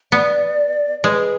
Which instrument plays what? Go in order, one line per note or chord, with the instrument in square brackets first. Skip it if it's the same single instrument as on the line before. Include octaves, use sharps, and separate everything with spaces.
[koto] B3 [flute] D5
[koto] G#3 [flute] B4